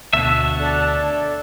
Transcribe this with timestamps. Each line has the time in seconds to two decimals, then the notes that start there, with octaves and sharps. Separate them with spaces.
0.13 D2 B2 D3 C#5 E5 F#5 A5
0.59 D4 A4